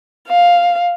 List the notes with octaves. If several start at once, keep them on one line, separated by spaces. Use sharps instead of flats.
F5